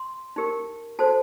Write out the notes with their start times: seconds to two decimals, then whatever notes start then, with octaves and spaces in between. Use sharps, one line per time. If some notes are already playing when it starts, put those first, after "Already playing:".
Already playing: C6
0.36 D#4 G4 A#4
0.99 F#4 A4 C5 A5